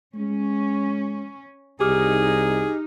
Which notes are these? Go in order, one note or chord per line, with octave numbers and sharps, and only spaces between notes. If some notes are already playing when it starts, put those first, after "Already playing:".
G#3 C#4
C2 D#4 G4 G#4 D6 F6